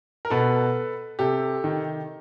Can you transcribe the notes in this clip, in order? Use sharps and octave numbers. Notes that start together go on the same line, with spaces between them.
A#4
B2 A4 B4
C3 G4 A4
D#3